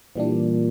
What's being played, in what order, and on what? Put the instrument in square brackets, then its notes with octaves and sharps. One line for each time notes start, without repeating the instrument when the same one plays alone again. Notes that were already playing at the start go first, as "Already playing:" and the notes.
[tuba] A#2 [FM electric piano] E3 G3 D4